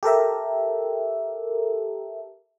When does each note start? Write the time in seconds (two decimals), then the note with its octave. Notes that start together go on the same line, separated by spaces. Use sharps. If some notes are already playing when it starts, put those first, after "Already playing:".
0.03 G4 A4 A#4 E5